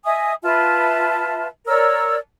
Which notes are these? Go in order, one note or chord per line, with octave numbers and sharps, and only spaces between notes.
D#5 E5 G#5 D#6
F4 B4 E5 A5
A#4 C#5 D5 E6